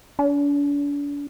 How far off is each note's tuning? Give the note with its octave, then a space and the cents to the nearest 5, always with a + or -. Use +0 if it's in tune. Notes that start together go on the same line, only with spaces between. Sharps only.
D4 -40